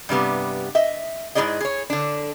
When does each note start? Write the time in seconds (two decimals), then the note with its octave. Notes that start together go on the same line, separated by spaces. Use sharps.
0.09 G2 C3 G3 B3
0.75 D#5 E5
1.35 G#2 G3 E4 G#4 D5 D#5
1.61 G#4 C#5
1.90 D3 D4